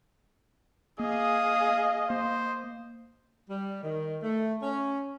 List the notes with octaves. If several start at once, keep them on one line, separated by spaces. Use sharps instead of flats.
A#3 G#4 D#5 F5 D#6
A#3 C5
G3
D#3
A3
C#4